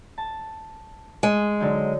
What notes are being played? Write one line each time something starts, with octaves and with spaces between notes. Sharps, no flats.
A5
G#3
D3 F#3 D#4